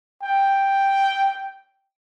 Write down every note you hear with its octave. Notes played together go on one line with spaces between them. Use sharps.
G5